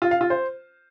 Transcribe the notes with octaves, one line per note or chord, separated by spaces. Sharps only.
F4
F5
F4
C5